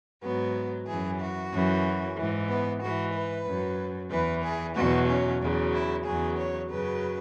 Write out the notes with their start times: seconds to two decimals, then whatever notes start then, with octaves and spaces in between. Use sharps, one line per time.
0.22 G#2 F#3 B3
0.87 F#2 E3 G#4
1.19 F#4
1.52 F#2 E3
2.16 G#2 E3
2.48 B3
2.81 G#2 E3 F#4
3.13 B4
3.45 F#2 F#3
4.11 E2 E3 B4
4.43 G#4
4.75 E2 B2 F#3 F#4
5.08 C#4
5.41 E2 C#3 F#3
5.73 E4
6.05 E2 C#3 F#3 G#4
6.38 C#5
6.70 F#2 C#3 F#3 B4